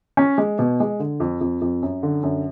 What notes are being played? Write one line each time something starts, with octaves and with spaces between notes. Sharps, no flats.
C#4
G#3
B2
G#3
D3
F2
F2
F2
F#2
D3
F#2